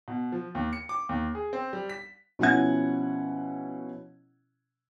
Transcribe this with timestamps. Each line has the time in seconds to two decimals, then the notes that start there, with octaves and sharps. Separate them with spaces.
0.08 B2
0.32 F3
0.55 D#2
0.73 C#7
0.89 D6
1.09 D#2
1.35 G#4
1.53 C4
1.73 G3
1.89 B6
2.39 B2 F3 C#4 E4 F#5 G#6